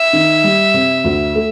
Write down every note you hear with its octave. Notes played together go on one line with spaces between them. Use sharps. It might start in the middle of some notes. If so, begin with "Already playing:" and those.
Already playing: E5
D#3
G3
C3
D2
A3